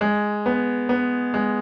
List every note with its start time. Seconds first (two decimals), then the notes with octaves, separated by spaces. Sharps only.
0.01 G#3
0.46 B3
0.89 B3
1.34 G#3